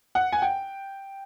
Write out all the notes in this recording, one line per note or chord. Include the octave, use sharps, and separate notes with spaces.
F#5
G#5
G5